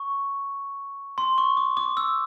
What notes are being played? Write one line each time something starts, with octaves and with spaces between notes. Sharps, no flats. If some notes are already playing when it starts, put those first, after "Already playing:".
Already playing: C#6
C6
C#6
D6
D6
E6